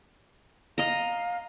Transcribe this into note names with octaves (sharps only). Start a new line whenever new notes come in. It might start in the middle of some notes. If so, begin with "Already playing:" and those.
D#5 F5 A#5